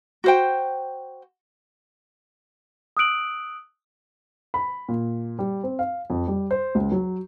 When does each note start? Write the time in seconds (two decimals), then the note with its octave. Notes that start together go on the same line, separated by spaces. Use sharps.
0.24 F#4 C5 G5
2.97 D#6 E6 F#6 D7 F#7
4.54 B5
4.89 A#2
5.39 G3
5.63 C4
5.79 F5
6.10 F2
6.28 G3
6.51 C5
6.75 C#2
6.92 F#3